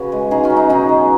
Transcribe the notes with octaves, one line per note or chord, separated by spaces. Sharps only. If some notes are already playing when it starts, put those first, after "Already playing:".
Already playing: C#3 F#4 B4
G#3
C#3 D#4 G#4
C#4 F#4
F#3
D#4
B2 D#4 G#4
F#3